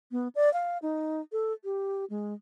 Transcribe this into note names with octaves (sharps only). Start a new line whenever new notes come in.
B3
D5
F5
D#4
A4
G4
G#3